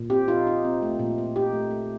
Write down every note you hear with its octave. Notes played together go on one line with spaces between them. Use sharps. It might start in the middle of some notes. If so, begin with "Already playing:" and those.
Already playing: A#2
C4 G4
D#4 F4
D#4
C4
A3
A#2
A#2
D#4 G4
A3
A3